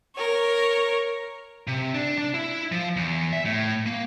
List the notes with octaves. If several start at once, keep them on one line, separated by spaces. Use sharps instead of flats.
A#4 C#5
C3
D4
D4
E4
F3
E2
E5
A2
A#3